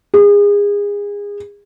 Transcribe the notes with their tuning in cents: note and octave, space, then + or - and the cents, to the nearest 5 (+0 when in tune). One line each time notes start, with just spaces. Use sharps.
G#4 -30